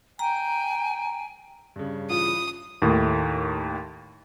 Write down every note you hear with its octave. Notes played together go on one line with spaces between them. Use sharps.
G5 G#5 A#5
G2 C#3
E3 F4 D#6
D#2 A2 D#3 A3